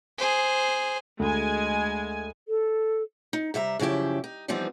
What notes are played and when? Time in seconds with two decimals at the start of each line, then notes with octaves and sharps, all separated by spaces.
0.18 G#4 C5
1.19 D2 G#3 G#5
2.48 A4
3.33 D#4
3.54 C3 G3 E5 A#5
3.79 F#2 C#3 F3 E4 G4
4.24 D#4
4.48 E3 F3 G3 B3 C4 D#4